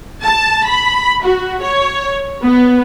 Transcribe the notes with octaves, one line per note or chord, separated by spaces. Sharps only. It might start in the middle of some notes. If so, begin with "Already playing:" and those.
A5
B5
F#4
C#5
B3